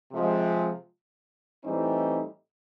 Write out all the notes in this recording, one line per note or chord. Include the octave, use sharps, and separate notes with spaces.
C3 F3 G#3
A2 E3 G3 C4 D#4